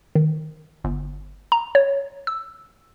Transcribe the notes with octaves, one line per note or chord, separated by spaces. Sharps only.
D#3
G1
A#5
C#5
E6